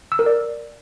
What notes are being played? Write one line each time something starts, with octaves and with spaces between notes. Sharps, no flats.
E6
A#4
D5